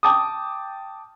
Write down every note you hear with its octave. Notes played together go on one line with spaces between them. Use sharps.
G5 A5 D6 D#6